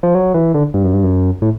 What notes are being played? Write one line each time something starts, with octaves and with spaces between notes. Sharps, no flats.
F3
F#3
E3
D3
G2
F#2
G2
F#2
A2